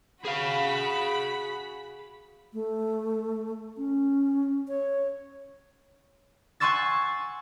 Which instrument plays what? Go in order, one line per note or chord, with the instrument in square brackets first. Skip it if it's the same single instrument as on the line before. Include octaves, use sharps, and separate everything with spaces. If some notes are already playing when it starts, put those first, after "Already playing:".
[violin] F#4 B5 [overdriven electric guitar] G#4 F5
[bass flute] A3
C#4
C#5
[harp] F#5 G#5 C6 C#6 E6 A6